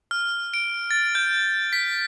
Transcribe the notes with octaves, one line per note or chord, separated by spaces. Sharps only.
F6
D7
A6
G6
B6